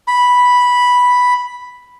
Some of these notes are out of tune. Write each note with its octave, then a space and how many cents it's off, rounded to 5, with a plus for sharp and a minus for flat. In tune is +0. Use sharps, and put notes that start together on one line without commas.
B5 -5